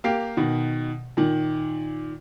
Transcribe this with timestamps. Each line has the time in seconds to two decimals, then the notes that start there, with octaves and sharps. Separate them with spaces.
0.04 A#3 G4 F5 C7
0.37 B2 D#3
1.17 A#2 D#3